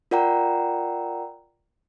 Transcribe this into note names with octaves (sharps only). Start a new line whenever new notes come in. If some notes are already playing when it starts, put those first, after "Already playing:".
F4 A#4 D5 F#5 G5 A#5